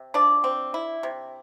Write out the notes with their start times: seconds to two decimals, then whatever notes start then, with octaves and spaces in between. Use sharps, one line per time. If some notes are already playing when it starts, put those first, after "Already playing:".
Already playing: C3
0.14 F3 D4 D5
0.44 C4
0.74 E4
1.03 C3